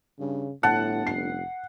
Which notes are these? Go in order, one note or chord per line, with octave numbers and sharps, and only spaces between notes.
G2 C#3
G1 A2 F#5 A5
F1 C7